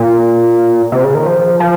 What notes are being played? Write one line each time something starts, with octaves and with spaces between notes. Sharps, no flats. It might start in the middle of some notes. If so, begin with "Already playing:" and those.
Already playing: A#2
C3
C#3
D#3
F3
F3